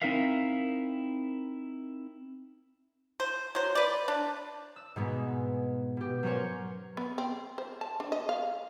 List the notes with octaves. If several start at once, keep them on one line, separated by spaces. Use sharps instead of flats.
C4 D#4 E4 A#4 E5 F5
C5
F#3 C5
B4 D5
D4
E6
G#2 B2 G#3 B3
B2 G4
F#3 C#4 A#4 C5 C#5
B3
C4
C5
A5
D4
D#5
F5